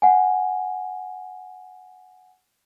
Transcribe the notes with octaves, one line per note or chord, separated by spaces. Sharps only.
F#5 G#5